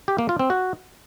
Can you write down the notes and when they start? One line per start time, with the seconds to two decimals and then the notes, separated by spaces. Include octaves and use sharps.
0.08 G4
0.18 A#3
0.29 F4
0.39 C4
0.50 F#4